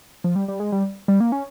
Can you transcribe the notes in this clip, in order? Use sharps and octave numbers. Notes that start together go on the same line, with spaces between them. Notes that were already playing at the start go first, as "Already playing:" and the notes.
F3
G3
G3
G#3
G3
G3
A#3
C#4